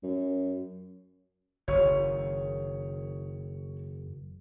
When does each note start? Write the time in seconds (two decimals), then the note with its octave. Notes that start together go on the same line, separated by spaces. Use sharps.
0.04 F#2
1.68 F#1 D#3 C#5 C#6